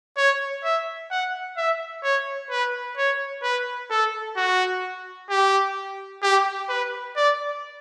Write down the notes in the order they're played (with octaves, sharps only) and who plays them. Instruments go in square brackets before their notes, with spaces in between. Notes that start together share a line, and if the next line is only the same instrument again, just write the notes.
[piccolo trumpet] C#5
E5
F#5
E5
C#5
B4
C#5
B4
A4
F#4
G4
G4
B4
D5